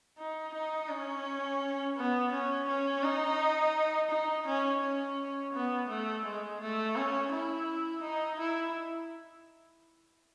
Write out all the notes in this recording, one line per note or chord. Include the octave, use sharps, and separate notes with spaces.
D#4
D#4
C#4
B3
C#4
C#4
D#4
D#4
C#4
C#4
B3
A3
G#3
A3
C#4
E4
D#4
E4